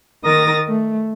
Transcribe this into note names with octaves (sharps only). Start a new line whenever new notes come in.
D#3 A#4 D#6 A6 A#6
A3